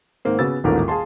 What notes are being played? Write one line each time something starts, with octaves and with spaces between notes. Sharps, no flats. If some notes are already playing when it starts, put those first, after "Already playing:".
G#2 D#3 A#3 C4
C#3 B3 F#4 E6 A6
D#1 A1 G#2 A4 A#4
G#4 F5 A5 C6